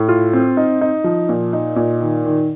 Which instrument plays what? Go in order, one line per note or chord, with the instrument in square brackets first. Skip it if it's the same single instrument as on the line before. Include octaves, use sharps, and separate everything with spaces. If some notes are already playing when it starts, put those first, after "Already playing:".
Already playing: [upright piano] A2
F4
C4
D#4
D#4
F3
A#2
D#4
A#2
D#3
D#3